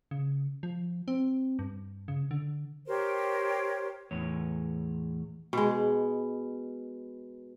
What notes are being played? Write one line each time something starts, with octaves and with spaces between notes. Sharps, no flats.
C#3
F3
C4
G2
C#3
D3
G4 A#4 C5 C#5
E2 A2 C#5
B2 G#3